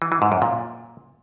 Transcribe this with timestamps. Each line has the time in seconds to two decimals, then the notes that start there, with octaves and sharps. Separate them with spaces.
0.02 E3
0.12 E3
0.22 G#2
0.32 F#2
0.42 A#2